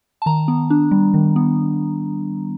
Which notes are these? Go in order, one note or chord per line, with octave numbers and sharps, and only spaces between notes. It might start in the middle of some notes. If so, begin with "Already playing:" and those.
A5
D#3 A#5
B3
D4
G3
D#3
B3